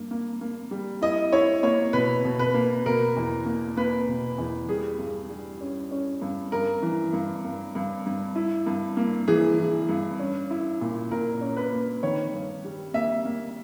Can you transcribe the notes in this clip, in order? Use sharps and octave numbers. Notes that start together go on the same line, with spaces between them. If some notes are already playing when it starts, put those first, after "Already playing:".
Already playing: G2 A#3
A#3
A#3
G3
E4 D#5
E4 C#5
A#3 C#5
B2 B4
B2
B4
A#3
B2 A#4
E2
A#3
A#3 B4
B2
E2
G3 G#4
G2
G3
C#4
C#4
G2
G2 A#4
E3
G2
G2
G2
G2
E4
G2
A#3
E3 G#4
E3
G2
C#4
E4
A#2
A#2 A#4
C#4
B4
A#3
D#3 C#5
G2
G3
A#3 E5
A#3